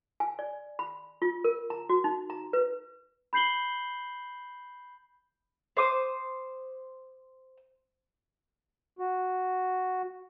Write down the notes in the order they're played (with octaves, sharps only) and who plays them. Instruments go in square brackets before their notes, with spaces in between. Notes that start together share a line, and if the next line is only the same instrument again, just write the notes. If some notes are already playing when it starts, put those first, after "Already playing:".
[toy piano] G#5
D5
B5
F4
A#4
A#5
F#4
D#4
A#5
B4
[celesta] B5 G6 C7 F#7 G7
[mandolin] C5 D6 D#6
[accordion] F#4